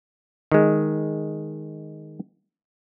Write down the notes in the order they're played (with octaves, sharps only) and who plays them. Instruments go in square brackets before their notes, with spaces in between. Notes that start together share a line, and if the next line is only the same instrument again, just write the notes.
[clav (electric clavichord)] D#3 G#3